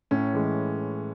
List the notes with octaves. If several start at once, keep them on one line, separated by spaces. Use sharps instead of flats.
A2 C#4
E3 G#3